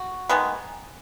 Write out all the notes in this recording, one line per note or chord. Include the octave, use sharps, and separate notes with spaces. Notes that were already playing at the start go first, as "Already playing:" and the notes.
Already playing: F#4
D#3 G#3 B3